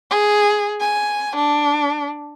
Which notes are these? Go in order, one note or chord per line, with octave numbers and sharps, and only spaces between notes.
G#4
G#5
D4